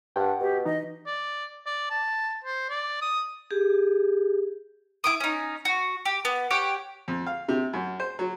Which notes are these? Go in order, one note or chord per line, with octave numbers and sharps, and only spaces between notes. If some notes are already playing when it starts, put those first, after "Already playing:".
G2 F#5 G5
B2 G4
E3 D#4 D#5
D5
D5
A5
C5
D5
D#6
G4 G#4
E4 D6 D#6
C#4 D#4
F#4
G4
B3
G4 C#5 F#5 G5
F2
F5
C3
F#2
C5
F#3